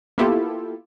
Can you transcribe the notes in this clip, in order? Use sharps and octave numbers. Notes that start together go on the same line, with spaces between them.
A#3 B3 E4 F4 G4 A4